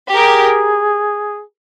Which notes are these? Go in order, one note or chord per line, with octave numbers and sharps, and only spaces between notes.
G4 G#4 A#4